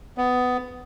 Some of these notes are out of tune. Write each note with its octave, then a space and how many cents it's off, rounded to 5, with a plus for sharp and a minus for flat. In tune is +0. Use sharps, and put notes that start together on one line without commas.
B3 +15